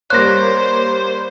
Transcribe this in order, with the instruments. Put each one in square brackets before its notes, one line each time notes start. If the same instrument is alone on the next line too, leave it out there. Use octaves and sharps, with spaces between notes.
[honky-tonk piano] G3 A#3 C#5 [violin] C5 [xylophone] F#6 A#6